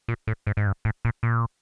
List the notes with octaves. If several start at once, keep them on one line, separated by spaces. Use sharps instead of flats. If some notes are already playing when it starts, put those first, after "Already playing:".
A#2
A2
G#2
G#2
G2
A2
A#2
A#2